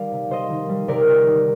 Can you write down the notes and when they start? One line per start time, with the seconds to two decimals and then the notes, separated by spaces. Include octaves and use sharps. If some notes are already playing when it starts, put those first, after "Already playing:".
Already playing: D#3 G3 D5 F5
0.12 C3
0.29 C3 C5 D#5
0.50 D#3
0.69 G3
0.88 C3 A#4 D5
1.07 C3
1.27 D#3